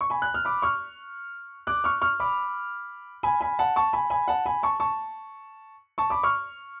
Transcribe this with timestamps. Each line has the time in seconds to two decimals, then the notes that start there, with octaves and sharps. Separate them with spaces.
0.01 C#6
0.10 G#5 B5
0.22 F#6
0.34 F6
0.45 B5 D6
0.62 C#6 F6
1.67 D6 F#6
1.84 C#6 F6
2.01 C#6 F6
2.20 B5 D6
3.23 G#5 B5
3.41 G#5 B5
3.59 F#5 A5
3.76 A5 C#6
3.93 G#5 B5
4.10 G#5 B5
4.28 F#5 A5
4.46 G#5 B5
4.63 A5 C#6
4.80 A5 C#6
5.98 A5 C#6
6.10 B5 D6
6.23 C#6 F6